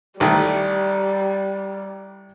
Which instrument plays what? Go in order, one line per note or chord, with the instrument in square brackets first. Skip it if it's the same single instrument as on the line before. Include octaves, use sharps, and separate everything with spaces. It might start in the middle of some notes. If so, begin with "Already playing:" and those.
[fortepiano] A1 D#3 A3 [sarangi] G3